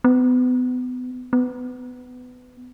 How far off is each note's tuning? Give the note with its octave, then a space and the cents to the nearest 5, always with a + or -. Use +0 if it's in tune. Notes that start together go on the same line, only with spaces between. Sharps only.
B3 +30
B3 +20